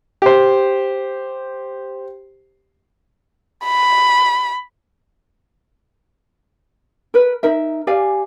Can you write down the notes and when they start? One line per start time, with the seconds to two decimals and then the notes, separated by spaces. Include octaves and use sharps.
0.22 G4 C5
3.64 B5
7.14 A#4 B4
7.43 D#4 A#4 E5
7.87 G4 D5 F5 G#5